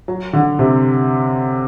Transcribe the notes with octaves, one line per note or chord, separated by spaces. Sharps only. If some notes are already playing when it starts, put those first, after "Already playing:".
F#3
D3
C3